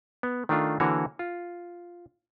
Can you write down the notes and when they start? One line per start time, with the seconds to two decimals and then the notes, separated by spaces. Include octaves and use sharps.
0.23 B3
0.49 D#3 A3 D4 F4
0.80 D3 E3 A#3 F#4 C#5
1.19 F4